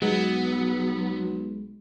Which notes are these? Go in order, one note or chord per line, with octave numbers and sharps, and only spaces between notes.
B1 F#3 G#3 B3